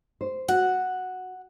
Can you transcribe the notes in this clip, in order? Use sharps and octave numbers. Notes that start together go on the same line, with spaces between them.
C5
F#4 F#5